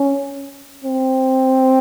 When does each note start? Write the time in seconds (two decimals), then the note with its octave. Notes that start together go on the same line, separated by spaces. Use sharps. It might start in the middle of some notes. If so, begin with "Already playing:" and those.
Already playing: C#4
0.84 C4